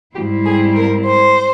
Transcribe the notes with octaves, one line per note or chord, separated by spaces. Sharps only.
G#2 G3 C4 E4 G4
G#4
A#4
C5